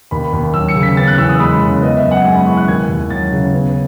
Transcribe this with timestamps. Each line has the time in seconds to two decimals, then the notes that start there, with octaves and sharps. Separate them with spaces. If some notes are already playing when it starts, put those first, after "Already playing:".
0.11 D#2 B5
0.33 D#2
0.54 F#3 E6
0.68 C#7
0.75 C#3
0.83 B6
0.97 B3 A6
1.07 F#6
1.18 E2 E6
1.29 D#6
1.40 G#3 B5
1.61 C#3
1.82 B3 D#5
1.97 E5
2.04 F#2
2.11 F#5
2.25 G#3 G#5
2.36 B5
2.46 E3 C#6
2.57 F#6
2.68 D#2 G#6
2.89 D#2
3.10 F#3 A6
3.32 C#3
3.53 B3